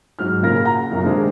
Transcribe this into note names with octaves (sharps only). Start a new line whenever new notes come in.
G#2 F#3 F#4 F6
A#2 C#3 A#4 A#6
F#5 A#5
B1 F#2 A#2
C3 D#3 G#3 C4 D4 G#4